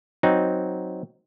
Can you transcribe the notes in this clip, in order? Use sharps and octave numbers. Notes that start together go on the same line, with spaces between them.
F#3 C4 D#4